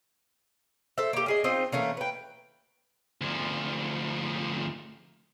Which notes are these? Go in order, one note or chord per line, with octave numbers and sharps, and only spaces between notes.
A4 C5 E5
A#3 G4
C#4 G#4 D#5
C4 D#4 F4 C5
E3 A3 A#3 C#4
B4 G5
D2 F3